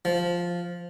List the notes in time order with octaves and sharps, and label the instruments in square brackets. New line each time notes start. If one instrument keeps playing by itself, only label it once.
[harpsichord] F3